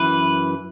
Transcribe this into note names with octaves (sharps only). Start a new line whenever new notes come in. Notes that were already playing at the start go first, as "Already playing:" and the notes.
Already playing: F#2 E3 B4